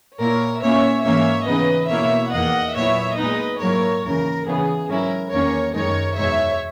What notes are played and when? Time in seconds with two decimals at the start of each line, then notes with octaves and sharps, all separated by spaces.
0.19 A#2 A#3 E4 A#4 C#5
0.62 A#2 A#3 C#4 E4 C#5 E5
1.05 G#2 E3 A#3 C#4 C#5 E5
1.48 C#3 E3 B3 D#4 B4 D#5
1.90 B2 A#3 E4 C#5 E5
2.32 E2 D#3 A#3 D#5 F#5
2.76 A#2 F#3 B3 E4 C#5 E5
3.18 A#2 G#3 B3 D#4 B4 D#5
3.61 G#2 F#3 A#3 E4 A#4 C#5
4.04 D#2 C#3 E3 A#4
4.46 C#3 E3 B3 G#4
4.89 G#2 F#3 C#4 E4 A#4
5.31 E2 D#3 A#3 C#4 A#4 C#5
5.74 F#2 D#3 G#3 D#4 A#4 C#5
6.16 E2 B2 G#3 D#4 C#5 E5